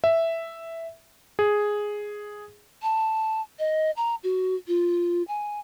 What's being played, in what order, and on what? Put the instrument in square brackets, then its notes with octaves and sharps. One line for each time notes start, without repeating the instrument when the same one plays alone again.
[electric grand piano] E5
G#4
[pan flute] A5
D#5
A#5
F#4
F4
G#5